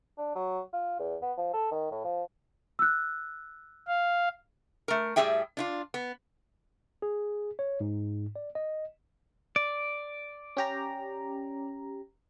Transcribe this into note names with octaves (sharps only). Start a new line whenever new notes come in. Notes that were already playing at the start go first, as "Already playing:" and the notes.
D4
F#3
F4
E2
B3
F3
A4
D#3
A2
F3
E6 F#6
F5
A3 A#4
A2 G3 C4 G#4 E5 G5
D4 E4 F4
B3
G#4
C#5
G#2
D5
D#5
D5
C#4 G4 A#5